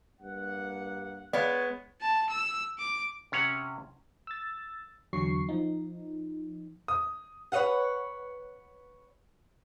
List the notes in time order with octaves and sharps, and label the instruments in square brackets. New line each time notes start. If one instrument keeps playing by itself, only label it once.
[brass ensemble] G2 A#3 F#5
[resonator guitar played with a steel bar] G#3 B3 [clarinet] C#5 [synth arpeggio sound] D5 F5
[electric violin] A5
E6
D6
[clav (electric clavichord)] C3 C#4 C#5 F#5
[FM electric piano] E6 A6
E2 D3 F#3 C#6 C7
F3 D#4
[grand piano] D#6
[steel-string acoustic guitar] B4 C#5 D#5 F5 F#5